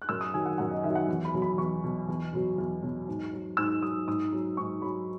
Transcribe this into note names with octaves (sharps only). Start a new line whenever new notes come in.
F#6
F#2 E6
D#6
D#3 F#3 G#5
F#5
F#2 F#5
D#5
D#3 F#3 E5
F#5
E2
B5
B2 F#3
B5
E2 C#6
B2 F#3
E2
B2 F#3
E2
B2 F#3
G#2
F#3
G#2 E6
F#3 D#6
G#2 D#6
F#3
G#2 C#6
F#3 B5